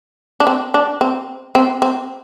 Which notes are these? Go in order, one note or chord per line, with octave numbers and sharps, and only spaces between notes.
D4
C4
D4
C4
C4
C4